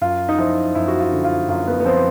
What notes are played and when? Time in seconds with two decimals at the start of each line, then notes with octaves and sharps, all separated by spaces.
0.01 F#2 F4
0.29 D#4
0.38 F3 E4
0.75 F#2 E4
0.88 F#4
1.00 F4
1.12 D3
1.24 F4
1.49 F#2 F4
1.67 B3
1.80 B3
1.85 F3 C4